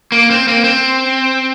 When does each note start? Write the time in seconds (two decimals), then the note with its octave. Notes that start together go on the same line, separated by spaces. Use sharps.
0.12 A#3
0.31 C4
0.48 A#3
0.64 C4